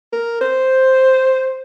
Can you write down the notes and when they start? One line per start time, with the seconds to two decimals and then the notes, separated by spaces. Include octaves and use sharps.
0.12 A#4
0.41 C5